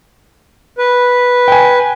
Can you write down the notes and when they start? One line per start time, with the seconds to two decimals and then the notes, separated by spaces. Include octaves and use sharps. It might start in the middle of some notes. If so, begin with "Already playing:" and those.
0.79 B4
1.48 G5 G#5